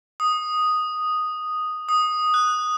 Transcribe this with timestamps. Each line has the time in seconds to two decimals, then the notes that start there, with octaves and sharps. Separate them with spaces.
0.20 D#6
1.89 D#6
2.34 F#6